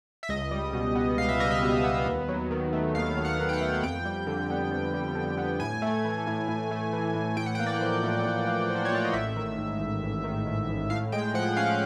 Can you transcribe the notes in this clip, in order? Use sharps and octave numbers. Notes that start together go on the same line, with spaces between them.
E5
C#2 D#5
G3
B2
B3
C#2 F5
E5
G3 D#5
E5
B2
B3
D#2
F#3
D#3
A3
D#2 F5
F#3
F#5
D#3
G5
F#5
A3
F2 G5
G3
D3
B3
F2
G3
D3
B3
A2 G#5
A3
E3
A2
A2
A3
E3
A2
A2 G5
F#5
G5
A#3
D5
F3
A2
A2
A#3
F3
C5
C#5
A2 D5
D#5
A1 E5
D#3
G#2
A1
A1
D#3
G#2
A1
A2 F5
G#3 G5
F3 F#5
C#4 F5